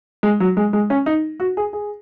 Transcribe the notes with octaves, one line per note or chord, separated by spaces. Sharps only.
G#3
F#3
G#3
G#3
C#4
D#4
F#4
G#4
G#4